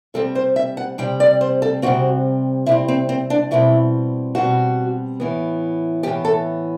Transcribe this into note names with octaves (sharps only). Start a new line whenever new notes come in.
C3 G3 C4 A4
C5
E5
F#5
C3 G3 C4 G5
D5
C5
A4
C3 G3 C4 F#4
C3 G3 C4 E4
C4
C4
D4
B2 G3 C4 E4
B2 G3 C4 F#4
A2 E3 B3
A2 E3 B3 G4
A4